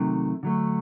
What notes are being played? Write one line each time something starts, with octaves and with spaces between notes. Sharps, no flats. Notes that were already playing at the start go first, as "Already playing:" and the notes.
Already playing: C3 D#3 F#3 A3
D3 F#3 A3